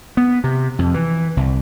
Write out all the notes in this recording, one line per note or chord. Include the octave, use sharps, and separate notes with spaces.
B3
C3
F2
E3
C2